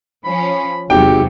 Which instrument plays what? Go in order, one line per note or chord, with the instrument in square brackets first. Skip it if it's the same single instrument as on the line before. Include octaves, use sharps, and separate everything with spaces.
[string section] F3 C#4 [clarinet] B5
[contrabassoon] G#1 [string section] E2 C3 F#3 [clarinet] G4 [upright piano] G5